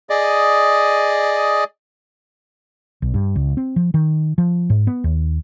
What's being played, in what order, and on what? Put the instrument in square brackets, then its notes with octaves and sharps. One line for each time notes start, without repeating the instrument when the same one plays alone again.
[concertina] G#4 D5 D#5
[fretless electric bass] B1
G2
C#2
C4
F3
D#3
F3
G#2
B3
D#2